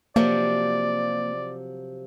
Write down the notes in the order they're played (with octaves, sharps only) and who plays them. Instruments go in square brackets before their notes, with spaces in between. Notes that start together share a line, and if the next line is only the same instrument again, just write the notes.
[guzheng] C3 F3 F#3 [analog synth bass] A#3 [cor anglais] D5